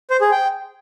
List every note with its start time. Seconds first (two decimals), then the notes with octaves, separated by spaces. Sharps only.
0.11 C5
0.21 G#4
0.32 G5